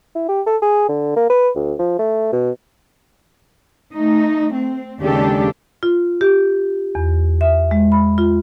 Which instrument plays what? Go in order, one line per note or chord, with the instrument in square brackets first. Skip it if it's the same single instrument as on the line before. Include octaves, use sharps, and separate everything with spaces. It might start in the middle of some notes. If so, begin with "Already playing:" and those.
[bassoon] E4
G4
A4
G#4
D3
A#3
B4
D2
F3
A3
B2
[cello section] A3 D#4
C4
D#2 C#3 G#3 D4 G4 A4
[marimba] F4
G4
E2
E5
G#3
B5
F4